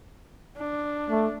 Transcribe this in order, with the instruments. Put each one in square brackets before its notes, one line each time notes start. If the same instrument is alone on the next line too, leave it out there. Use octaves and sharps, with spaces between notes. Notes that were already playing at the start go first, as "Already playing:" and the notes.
[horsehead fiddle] D4
[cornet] A3